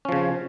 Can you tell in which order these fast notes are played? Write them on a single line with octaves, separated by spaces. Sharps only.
C#4 F3 C#3